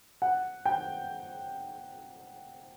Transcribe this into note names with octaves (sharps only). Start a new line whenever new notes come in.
F#5
G5